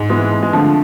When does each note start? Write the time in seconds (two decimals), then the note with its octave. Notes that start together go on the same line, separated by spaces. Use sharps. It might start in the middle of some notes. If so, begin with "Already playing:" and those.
Already playing: G#2
0.09 E3 G#3 B3
0.31 F2
0.43 G#3
0.53 D3 F3 A3